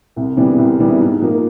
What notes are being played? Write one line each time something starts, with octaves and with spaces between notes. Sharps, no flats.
C2
C3 E3 G3 B3
C2
C3 E3 G3 B3
G#2
F3 A#3